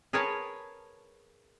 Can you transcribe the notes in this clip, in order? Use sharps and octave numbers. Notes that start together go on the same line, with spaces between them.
G#4 A#4 B4 C#5 G#5 A5